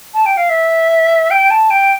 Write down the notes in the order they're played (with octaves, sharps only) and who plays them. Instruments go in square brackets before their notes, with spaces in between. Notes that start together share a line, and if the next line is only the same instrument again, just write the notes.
[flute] A5
G5
F5
E5
G5
A5
G5